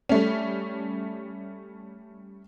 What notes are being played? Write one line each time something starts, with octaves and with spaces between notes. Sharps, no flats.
G3 A3 C#4